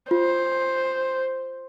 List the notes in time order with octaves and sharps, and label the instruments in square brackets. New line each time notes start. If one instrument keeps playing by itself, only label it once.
[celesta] F4 [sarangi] C5